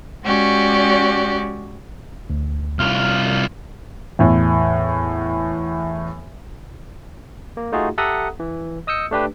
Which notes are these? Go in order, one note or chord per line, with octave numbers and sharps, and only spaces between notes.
G#3 C#4 F#4 G4 D5
D2
C2 F4 F6
E2 A2
A#3
A3 D#4 F4 F#4 G#4
G4 A4 E5 F#5 A#5 D#6
E3
D#5 D#6 E6 G6 C#7
A3 D4 G4 B4